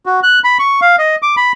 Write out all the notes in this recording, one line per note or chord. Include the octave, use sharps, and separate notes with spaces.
F#4
F#6
B5
C#6
F5
D#5
D6
B5